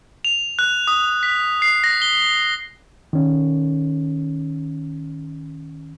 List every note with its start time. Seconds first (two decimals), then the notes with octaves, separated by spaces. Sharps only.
0.25 F7
0.59 F#6
0.87 D#6
1.23 B6
1.62 C7
1.84 A#6
2.02 G7
3.13 D#3 C#4